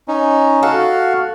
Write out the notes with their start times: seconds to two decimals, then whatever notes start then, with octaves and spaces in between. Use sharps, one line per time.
0.08 C#4 D#4
0.63 F#4 A4 F5 F#5